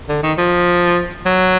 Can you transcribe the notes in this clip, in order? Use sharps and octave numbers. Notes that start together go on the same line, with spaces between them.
D3
D#3
F3
F#3